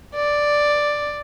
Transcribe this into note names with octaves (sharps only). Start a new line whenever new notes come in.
D5